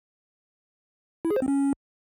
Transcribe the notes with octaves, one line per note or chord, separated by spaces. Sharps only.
E4
G#4
C5
C4
C#4